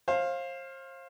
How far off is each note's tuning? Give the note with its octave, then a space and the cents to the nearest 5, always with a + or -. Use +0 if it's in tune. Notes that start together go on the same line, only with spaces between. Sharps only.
C5 +35 F5 +0